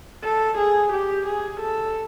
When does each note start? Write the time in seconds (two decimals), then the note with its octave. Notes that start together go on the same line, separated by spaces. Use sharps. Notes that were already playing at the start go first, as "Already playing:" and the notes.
0.23 A4
0.58 G#4
0.93 G4
1.26 G#4
1.60 A4